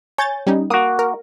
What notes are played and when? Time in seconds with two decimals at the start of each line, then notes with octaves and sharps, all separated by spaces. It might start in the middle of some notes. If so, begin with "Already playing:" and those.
0.18 C#5 G#5 G6 A6
0.47 G3 C#4 D#4
0.70 A#3 F#4 D#6
0.99 A#4